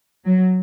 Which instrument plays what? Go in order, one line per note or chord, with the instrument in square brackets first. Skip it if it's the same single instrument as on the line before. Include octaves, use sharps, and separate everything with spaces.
[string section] F#3